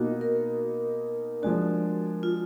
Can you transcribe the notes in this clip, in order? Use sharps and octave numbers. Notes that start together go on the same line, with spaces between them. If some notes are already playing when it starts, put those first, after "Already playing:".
Already playing: B2 A#3 D#4 F#4
A#4
F3 G#3 D4 F#4
F4